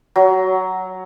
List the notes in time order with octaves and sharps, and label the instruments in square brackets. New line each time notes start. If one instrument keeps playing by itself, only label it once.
[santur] F#3